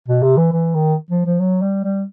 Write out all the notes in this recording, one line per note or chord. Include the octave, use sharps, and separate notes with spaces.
B2
C3
E3
E3
D#3
F3
F3
F#3
G3
G3